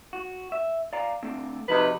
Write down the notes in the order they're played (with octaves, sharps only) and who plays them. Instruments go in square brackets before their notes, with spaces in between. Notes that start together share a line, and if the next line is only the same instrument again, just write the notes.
[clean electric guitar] F#4
E5
D5 F5 A#5
D3 A3 C4
[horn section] C3 D#4 B4 [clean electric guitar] F3 F#4 G#4